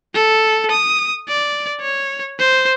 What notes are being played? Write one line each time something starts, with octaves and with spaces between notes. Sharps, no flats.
A4
D#6
D5
C#5
C5